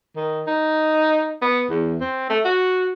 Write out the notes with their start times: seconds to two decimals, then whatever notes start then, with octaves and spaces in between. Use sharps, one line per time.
0.16 D#3
0.47 D#4
1.42 B3
1.70 E2
2.00 C4
2.29 A3
2.45 F#4